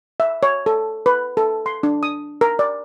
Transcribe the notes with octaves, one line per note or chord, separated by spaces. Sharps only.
E5
C#5
A4
B4
A4
C6
D4
D#6
A#4
D5